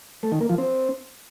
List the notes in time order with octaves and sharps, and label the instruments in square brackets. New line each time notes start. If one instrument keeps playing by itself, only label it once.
[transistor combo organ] A3
D#3
A#3
F3
C4